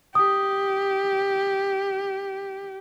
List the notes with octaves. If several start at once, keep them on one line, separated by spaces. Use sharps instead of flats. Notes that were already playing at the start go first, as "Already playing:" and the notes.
G4 D#6